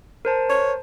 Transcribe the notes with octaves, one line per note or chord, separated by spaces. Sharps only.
A#4 C5 A5
C#5